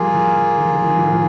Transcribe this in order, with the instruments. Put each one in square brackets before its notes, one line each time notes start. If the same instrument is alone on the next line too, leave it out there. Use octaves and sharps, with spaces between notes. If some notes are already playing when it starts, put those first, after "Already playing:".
Already playing: [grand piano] F3 G3 [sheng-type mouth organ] A#3 F4 G#4
[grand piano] F3
D#3
F3
D#3
F3
D#3
F3
D#3
F3